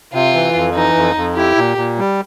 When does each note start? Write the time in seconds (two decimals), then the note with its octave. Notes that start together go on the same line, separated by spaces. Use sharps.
0.14 C3 F4
0.34 E3
0.55 F2
0.75 E3 D#4
0.96 F2
1.16 F2
1.36 E4 G4
1.57 A#2
1.77 A#2
1.98 G3